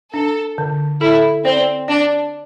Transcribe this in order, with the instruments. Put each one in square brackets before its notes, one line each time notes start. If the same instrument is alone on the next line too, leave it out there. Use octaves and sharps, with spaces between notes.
[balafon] D4 [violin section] A4
[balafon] D3
[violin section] E4 [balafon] A4
[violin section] C4 [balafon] D5
[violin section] D4 [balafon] D5